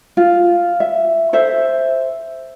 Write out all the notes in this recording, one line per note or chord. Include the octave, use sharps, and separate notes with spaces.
F4
E5
A4 C5 E5